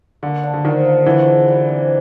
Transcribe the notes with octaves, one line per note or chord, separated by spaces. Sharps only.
D3 A#3
D4
D3
D#3 F3
A#3
D3 E3 F3
G#3
G3
C4